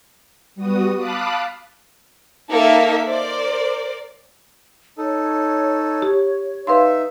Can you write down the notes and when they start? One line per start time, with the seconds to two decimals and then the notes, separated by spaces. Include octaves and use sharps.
0.55 G3 B3 F#4 D#6
0.95 F5 A5 B5 D6 D#6 F#6
2.49 A#3 D#4 A4 A#4 E5
3.05 A#4 C5 D5
4.98 D#4 A4 C#5
6.02 G4
6.67 D#4 B4 E5 F5 C6